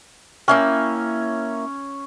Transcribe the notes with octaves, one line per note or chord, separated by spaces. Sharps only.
A#3 C#4 E4 G5